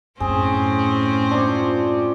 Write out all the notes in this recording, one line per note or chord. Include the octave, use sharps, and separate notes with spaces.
F#2 A2 C4 C#4 G#4
D4 F4 C5